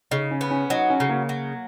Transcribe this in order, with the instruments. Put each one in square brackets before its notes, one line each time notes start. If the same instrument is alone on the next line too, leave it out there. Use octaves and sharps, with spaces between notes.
[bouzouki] C#3 [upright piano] D#4
[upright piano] C#4
[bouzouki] B3
[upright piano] C#4
[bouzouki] F#3 [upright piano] D#4
[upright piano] C#4
[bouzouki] C#3
[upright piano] A#3
[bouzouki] F#3